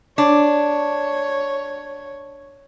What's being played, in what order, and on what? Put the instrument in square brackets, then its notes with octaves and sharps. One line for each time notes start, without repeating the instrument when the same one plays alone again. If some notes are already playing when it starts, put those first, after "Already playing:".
[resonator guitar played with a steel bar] D4 [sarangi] C#5